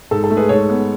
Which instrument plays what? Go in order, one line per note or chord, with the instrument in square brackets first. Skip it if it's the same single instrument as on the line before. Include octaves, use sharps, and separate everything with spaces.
[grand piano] G#2 A4
A4
A3
G#4 B4
G#2 A4 C#5
B3